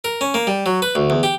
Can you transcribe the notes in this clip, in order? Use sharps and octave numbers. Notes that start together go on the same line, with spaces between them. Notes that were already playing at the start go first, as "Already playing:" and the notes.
A#4
C#4
A#3
G3
F#3
B4
D2
E2
G4